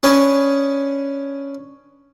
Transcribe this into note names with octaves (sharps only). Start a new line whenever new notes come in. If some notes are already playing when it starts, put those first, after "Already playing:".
C#4 D4 B4 G#5 D#6